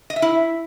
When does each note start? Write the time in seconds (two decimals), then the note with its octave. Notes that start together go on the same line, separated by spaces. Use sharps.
0.10 D#5
0.16 E5
0.22 E4